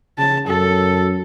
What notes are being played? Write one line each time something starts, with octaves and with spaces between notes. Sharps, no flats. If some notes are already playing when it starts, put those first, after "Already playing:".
C#3 A5
F#2 A4